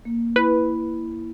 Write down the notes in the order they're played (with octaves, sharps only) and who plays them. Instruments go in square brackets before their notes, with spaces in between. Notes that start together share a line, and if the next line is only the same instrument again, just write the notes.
[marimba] A#3
[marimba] E4 B5 [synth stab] B4